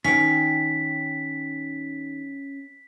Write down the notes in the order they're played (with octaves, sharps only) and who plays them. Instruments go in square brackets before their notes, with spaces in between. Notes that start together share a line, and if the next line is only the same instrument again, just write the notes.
[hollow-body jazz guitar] D#3 C#5 [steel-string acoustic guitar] C#4 G5 [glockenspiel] B6